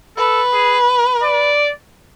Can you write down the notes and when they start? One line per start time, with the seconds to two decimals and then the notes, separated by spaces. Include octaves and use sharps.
0.17 A4 B4
0.53 G#4
1.23 D5